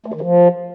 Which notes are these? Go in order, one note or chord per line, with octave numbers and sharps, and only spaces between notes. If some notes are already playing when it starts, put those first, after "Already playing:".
A3
D#3
F3